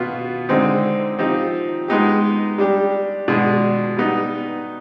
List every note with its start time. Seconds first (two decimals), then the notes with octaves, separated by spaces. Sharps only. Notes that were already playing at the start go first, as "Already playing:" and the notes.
Already playing: B2 B3 F4
0.49 D3 G#3 C4 D#4
1.19 F3 C4 D#4 G4
1.88 G#3 B3 D#4 G4
2.58 G3 D4 G4
3.28 B2 G#3 D4
3.97 G3 B3 D#4